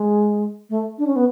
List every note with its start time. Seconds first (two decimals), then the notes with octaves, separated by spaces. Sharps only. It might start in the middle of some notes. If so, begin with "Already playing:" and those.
Already playing: G#3
0.70 A3
0.98 D4
1.07 C#4
1.16 B3